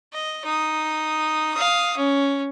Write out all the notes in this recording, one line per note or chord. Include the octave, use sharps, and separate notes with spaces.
D#5
D#4 D#6
F5 D#6
C#4